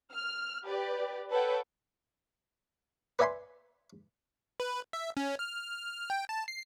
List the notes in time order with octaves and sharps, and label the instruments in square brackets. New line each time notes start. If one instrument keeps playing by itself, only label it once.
[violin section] F6
G4 B4 D5
A4 B4 C#5 F#5 G5
[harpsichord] B4 D5 E5 G#5 B5 C6
[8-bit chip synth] B4
E5
C#4
F6
G5
A5
C7